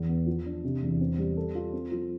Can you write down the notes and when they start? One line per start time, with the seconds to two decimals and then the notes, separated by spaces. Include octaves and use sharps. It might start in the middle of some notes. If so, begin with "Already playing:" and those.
Already playing: E2
0.09 B3
0.26 F3
0.46 D4
0.64 C3
0.82 E2
1.01 C4
1.18 G3
1.37 A4
1.55 F4
1.73 C4
1.92 F3